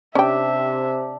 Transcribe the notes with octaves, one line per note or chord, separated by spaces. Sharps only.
C3 C#4 D4 G4 E5 G5